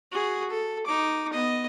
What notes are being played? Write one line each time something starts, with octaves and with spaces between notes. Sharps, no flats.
F#4 G#4
A4
D#4 D6
B3 D#5